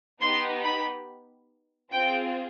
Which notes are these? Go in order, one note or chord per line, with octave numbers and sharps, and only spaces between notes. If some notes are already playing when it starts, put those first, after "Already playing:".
B3 D#4 G4 C6
B5
C4 F4 G#4 G5